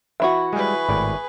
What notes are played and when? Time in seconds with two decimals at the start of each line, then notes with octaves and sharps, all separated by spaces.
0.20 E3 E4 F#4 E5 B5 C#6
0.53 G3 G#3 G#4 B4
0.89 G#1 A2 D5